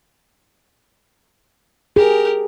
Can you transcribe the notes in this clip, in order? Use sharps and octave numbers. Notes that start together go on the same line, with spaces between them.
G4 G#4 A#4